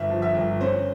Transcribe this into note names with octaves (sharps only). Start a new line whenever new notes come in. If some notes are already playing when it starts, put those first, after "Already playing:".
Already playing: G1 E5
F3
E5
G1
C#4 C5